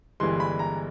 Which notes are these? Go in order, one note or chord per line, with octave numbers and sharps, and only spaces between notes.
G1 G2 E3 G#3 C6
B5
A#5